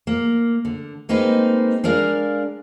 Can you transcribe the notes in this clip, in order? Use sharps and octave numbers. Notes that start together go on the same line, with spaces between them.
A#3
D3
G#3 A#3 C4 D#4 B4
G#3 D4 A#4 D5 F5